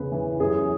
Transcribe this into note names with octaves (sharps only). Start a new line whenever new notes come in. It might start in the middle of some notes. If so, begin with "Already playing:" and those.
Already playing: E2 C#3 B4
E3
F#2 G#4